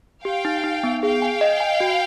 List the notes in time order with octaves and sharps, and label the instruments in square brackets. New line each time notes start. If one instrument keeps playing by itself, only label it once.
[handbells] G4 [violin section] F5 G5
[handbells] D#4
D#4
B3
[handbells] G#4 [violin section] F5 G5
[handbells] G#5
D#5
G#5
F#4